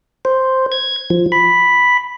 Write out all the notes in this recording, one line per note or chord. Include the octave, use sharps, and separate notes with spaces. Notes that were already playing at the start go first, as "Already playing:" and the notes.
C5
G#6
F3
B5